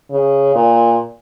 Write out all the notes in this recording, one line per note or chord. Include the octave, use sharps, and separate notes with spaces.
C#3
A#2